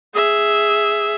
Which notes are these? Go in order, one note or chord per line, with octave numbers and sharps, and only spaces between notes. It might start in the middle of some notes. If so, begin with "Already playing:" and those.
G#4 E5